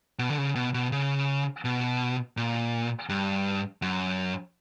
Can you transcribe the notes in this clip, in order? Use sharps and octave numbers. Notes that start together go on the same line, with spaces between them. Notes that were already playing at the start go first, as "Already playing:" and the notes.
B2
D3
C#3
B2
B2
C#3
B2
A#2
G2
F#2